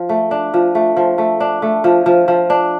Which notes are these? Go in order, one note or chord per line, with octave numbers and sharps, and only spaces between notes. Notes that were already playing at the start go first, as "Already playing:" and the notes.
Already playing: F3
A3
D4
F3
A3
F3
A3
D4
A3
F3
F3
F3
D4